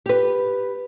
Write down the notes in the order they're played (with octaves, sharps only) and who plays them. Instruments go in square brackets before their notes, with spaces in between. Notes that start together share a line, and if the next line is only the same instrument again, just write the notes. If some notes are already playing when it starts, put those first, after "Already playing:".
[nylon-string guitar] G4 B4